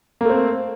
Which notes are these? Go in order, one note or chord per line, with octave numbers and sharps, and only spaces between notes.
A3 A#3 C4